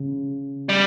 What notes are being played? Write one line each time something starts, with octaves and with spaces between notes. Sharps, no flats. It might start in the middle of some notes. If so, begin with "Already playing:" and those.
Already playing: C#3
G3